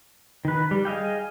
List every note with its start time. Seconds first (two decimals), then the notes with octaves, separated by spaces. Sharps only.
0.45 D#3 B4
0.71 G3
0.85 G#4 D#5 F5 G5